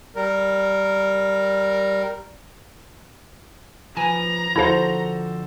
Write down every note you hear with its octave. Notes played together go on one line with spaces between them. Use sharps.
G3 A#4
F3 B4 G#5 A#5
D3 F3 E4 F#4 A4 C5 F5